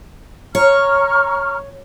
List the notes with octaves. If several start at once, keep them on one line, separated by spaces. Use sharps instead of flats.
C#5 A#5 C#6 F6